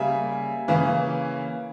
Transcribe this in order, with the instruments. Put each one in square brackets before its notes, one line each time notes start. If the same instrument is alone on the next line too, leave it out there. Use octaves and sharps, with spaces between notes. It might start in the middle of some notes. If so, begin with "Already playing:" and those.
Already playing: [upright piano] C#3 G3 A#3 E5 G#5
C#3 E3 A#3 C#4